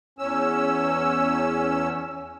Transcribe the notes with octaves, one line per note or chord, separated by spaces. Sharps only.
E2 C#4 E6